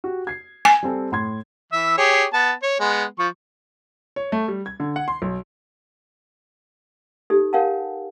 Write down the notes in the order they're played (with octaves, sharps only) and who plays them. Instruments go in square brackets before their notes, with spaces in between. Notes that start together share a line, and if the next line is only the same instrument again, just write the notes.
[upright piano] F#4 G4
G#6 C7
[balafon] G#5
[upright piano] G3 C4 A4
A2 C6 G#6
[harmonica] E3 E5 E6
G4 G#4 C#5
B3 A5
C#5
G#3 B3
F3 C#6
[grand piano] C#5
A3
G3
G#6
D3
F#5
C6
B1
[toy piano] D#4 G4 A4
A#4 C#5 F5 F#5 G#5 A5